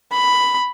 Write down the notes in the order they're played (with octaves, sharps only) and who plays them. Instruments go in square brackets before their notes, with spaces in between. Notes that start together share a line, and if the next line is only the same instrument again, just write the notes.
[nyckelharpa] B5